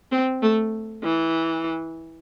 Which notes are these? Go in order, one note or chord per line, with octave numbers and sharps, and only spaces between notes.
C4
A3
E3